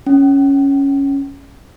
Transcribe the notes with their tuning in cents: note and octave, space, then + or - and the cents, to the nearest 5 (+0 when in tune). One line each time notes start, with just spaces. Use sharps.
C#4 +0 G5 -35